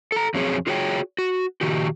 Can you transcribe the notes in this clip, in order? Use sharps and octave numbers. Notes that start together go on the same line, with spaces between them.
A4 A#5
F2 F#3 C4 G#4 C#5
F4 F#4 G#4 C#5 F#5 G5
F#4
A#2 D#3 F#4 G4